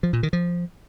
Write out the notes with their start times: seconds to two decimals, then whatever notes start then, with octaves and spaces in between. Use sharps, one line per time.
0.03 F3
0.13 A#2
0.23 D#3
0.33 F3